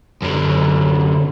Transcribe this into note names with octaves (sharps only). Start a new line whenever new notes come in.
F#2 D3